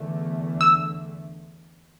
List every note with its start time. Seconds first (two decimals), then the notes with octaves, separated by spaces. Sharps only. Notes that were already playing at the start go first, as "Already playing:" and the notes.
Already playing: E2 D3 A3
0.61 E6